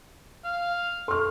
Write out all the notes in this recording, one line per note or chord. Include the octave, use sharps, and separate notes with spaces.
F5
A4 C6 C#6 F6